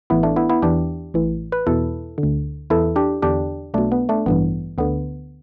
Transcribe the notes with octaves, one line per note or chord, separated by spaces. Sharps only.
A1 A2 E3 B3 E4
A3 D4
B3 E4
B3 E4
E2 E3 D4 G4
A1 A2 E3
B4
E2 B2 E4 A4
D3
D2
E2 E3 E4 A4
D4 G4
E2 D3 D4 G4
B1 B2 A3 D4
B3
A3 D4
A1 G2 E3 B3
D2 D3 B3